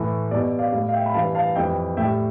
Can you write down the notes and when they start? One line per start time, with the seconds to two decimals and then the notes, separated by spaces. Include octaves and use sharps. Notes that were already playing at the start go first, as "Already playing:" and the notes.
Already playing: A2 E3 A3
0.31 B2 G3 D5
0.59 D5 F5
0.72 A2 G3 D5 F5
0.89 F5
0.93 E5 G5
1.06 B5
1.14 G2 E3 G3 F5 A5
1.35 F5 A5
1.55 F2 E3 G3 E5 G5
1.97 A2 E5 G5
2.01 G3